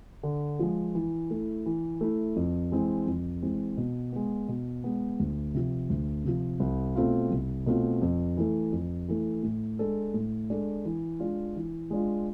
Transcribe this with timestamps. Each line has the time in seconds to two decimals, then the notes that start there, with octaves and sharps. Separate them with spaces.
0.23 D3
0.59 F3 G#3
0.95 E3
1.30 A3 E4
1.66 E3
2.01 A3 E4
2.36 F2
2.72 E3 G#3 C4
3.07 F2
3.42 E3 G#3 C4
3.77 B2
4.12 G#3 B3
4.48 B2
4.84 G#3 B3
5.19 D2
5.54 C3 F3
5.90 D2
6.24 C3 F3
6.60 C2
6.96 B2 A3 C4 F4
7.31 C2
7.66 B2 A3 C4 F4
8.02 F2
8.37 E3 A3
8.72 F2
9.08 E3 A3
9.43 A2
9.79 G#3 D4 A4
10.14 A2
10.50 G#3 D4 A4
10.85 E3
11.20 G#3 D4 F4
11.56 E3
11.90 G#3 D4 F4